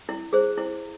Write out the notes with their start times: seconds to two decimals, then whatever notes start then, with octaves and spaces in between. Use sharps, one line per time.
0.09 E4
0.33 G#4 C5
0.58 E4